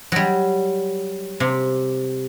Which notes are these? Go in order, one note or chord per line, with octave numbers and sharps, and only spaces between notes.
F#3 G3
C3